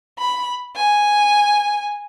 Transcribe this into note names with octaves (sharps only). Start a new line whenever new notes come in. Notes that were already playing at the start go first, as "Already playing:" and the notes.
B5
G#5